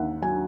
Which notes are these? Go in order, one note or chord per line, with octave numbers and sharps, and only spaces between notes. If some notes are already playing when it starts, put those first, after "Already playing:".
Already playing: D#2 E5 F#5
F#3 G#5